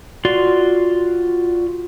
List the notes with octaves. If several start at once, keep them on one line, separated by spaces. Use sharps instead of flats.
F4 F#4 D5 C6